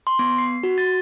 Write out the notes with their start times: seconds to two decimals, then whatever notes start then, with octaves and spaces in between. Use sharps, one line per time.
0.07 C6
0.19 B3
0.38 C7
0.63 F#4
0.78 A6